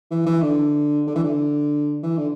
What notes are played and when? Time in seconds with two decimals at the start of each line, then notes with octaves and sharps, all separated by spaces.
0.11 E3
0.26 E3
0.42 D3
1.07 D3
1.15 E3
1.24 D3
2.03 E3
2.17 D3